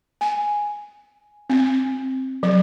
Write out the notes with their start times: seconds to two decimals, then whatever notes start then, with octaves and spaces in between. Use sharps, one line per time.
0.21 G#5
1.50 C4
2.43 F#3